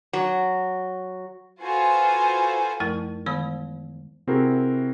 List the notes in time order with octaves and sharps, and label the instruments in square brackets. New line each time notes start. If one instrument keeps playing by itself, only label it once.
[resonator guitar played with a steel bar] F#3
[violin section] F4 F#4 A4 B4 C5 G#5
[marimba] F#2 F3 A3 E4 A#4 A5
D#3 E3 G#3 B3 C5 B5
[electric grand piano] C3 C4 E4 F#4 G#4 A#4